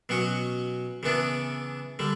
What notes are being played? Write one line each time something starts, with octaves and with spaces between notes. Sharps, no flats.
B2 F#3 C#4 F#4
C#3 E3 B3 D4
D3 G3